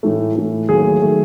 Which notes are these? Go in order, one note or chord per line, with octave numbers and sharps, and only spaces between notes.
A2 E3 A3
A2 E3 A3
D#2 D#3 F#3 A3 G#4
D#3 F#3 A3